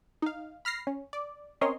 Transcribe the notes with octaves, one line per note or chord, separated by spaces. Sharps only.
D#4 F5
B5 F6 A#6 C7
C#4
D5
C4 C#4 A#4 C#5 D#5 C6